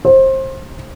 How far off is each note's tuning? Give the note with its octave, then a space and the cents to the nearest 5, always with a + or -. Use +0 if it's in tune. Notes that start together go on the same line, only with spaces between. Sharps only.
C5 +25